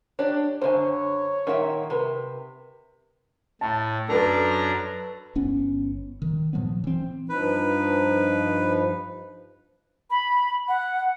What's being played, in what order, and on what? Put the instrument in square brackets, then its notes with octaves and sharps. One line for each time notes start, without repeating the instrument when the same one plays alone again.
[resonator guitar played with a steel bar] D4 G4 [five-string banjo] C#5
[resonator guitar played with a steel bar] F#2 D3 [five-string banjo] C5 G#5 [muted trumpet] C#5
[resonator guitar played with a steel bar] A#2 E5 [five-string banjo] D#3 F#5 G5
[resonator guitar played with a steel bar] C3 [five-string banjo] A#4 B4
[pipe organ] A2 [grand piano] A5
[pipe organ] F#2 D4 A#5 [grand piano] A4 B4
[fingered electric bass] G1 B3 C#4
D#3
A#2 F3 F#3 B3
E3 C4
[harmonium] G2 F3 D#4 [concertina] B4
[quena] B5
F#5